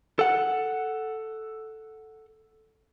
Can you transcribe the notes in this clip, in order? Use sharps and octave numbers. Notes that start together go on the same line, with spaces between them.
A4 F#5